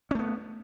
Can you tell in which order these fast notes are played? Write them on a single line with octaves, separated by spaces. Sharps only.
C#4 A3 B3